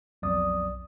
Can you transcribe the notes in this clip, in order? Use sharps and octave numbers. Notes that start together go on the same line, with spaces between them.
B1 F2 D5 D#6